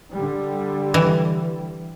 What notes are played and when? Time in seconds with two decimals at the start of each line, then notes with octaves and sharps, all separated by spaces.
0.12 D3 G3
0.94 E3